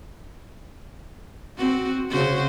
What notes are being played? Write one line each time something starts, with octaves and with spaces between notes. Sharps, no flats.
C4 F#4
C#3 F#4 C5